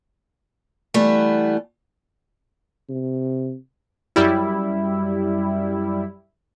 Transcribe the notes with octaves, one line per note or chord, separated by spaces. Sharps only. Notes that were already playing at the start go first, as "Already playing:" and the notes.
E3 G3 A3 B3
C3
F#2 G3 E4